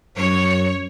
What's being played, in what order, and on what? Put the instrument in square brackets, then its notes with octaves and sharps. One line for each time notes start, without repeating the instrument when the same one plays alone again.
[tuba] F#2 [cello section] C#5